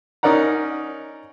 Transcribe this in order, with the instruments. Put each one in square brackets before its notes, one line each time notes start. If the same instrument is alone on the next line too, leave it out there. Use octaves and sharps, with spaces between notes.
[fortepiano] C#4 D#4 A#4 D5 F#5 A#5